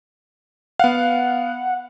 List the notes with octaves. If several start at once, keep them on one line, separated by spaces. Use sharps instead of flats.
B3 F5 F#5